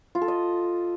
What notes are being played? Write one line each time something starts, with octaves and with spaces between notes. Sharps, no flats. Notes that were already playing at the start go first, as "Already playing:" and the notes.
F4
A4
D#5